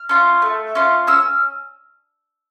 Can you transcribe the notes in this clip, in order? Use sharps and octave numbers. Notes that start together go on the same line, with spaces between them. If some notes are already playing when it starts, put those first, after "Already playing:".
Already playing: F6
C#4 F4
A3
C#4 F4
C#4 E6